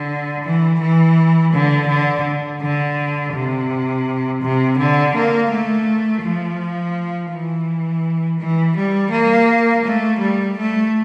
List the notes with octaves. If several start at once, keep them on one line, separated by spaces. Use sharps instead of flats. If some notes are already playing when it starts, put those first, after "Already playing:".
Already playing: D3
E3
E3
D3
D3
D3
C3
C3
D3
A#3
A3
F3
E3
E3
G3
A#3
A3
G3
A3